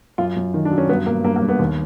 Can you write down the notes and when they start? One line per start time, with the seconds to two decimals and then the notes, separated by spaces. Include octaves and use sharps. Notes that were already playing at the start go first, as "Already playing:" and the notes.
0.18 F#2 F4
0.36 F#2
0.54 D#3
0.65 D4
0.71 F#3
0.78 C#4
0.89 G2 B3
1.06 G2 A#3
1.24 G2 A#3
1.36 A#3
1.42 G2
1.49 B3
1.59 D#2